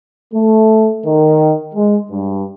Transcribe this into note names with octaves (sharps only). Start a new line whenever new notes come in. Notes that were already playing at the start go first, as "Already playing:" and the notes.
A3
D#3
G#3
G2